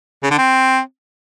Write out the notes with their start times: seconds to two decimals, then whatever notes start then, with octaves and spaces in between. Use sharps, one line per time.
0.23 C#3
0.31 D3
0.38 C4